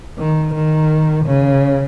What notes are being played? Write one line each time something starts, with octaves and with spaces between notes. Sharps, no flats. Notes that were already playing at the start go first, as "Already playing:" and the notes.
D#3
D#3
C#3